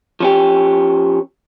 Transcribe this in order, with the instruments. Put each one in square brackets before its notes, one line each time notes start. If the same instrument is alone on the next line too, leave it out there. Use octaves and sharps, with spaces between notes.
[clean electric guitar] F3 C#4 G4